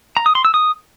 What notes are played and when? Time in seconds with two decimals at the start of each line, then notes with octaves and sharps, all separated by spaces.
0.17 A#5
0.26 D#6
0.35 C6
0.45 E6
0.54 D#6